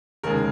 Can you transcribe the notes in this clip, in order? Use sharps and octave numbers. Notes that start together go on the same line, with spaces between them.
F1 D#2 C#3 G#3 A#4